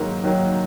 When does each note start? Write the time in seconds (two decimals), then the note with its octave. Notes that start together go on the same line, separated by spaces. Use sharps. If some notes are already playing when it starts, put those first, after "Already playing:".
Already playing: G#2 D#3 F#3 A#3
0.23 D#3 F#3 A#3